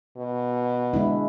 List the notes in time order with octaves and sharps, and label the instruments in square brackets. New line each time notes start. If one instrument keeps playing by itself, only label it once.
[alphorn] B2
[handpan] G#3 D4 E4